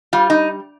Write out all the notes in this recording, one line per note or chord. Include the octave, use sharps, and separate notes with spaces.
G3 F4
D#4